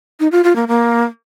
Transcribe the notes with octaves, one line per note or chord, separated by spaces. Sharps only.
D#4
F4
F4
A#3
A#3